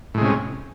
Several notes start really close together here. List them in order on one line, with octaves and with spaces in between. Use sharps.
A2 G#3 C3 C#4